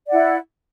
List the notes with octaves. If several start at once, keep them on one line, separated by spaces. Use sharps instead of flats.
E4 D5 F#5